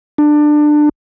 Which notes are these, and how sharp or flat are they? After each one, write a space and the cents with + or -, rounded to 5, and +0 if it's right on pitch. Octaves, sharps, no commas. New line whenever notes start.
D4 +20